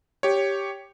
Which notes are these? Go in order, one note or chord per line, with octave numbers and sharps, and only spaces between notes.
G4 C#5